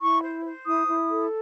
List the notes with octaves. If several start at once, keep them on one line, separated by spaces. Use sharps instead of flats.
E4 C#6
C5
C5
E4 D#6
E4
A4